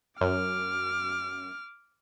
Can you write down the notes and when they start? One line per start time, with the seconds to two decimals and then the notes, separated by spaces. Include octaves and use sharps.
0.21 F#2 D6 F6